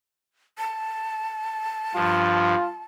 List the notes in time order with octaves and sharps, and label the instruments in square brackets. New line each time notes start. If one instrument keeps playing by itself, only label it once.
[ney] A5
[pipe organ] G2 F3 [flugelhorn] F4